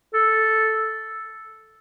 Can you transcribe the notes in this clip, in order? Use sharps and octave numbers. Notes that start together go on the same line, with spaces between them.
A4